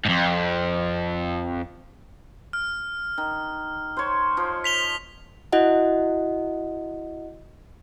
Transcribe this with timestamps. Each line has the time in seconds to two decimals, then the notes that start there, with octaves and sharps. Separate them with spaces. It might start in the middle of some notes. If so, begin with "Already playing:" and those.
0.05 F2 G#2
2.53 F6
3.18 D#3
3.97 C5 C#5
4.37 F3
4.64 B6 F7 G7
5.52 E4 F#4 D#5 F#5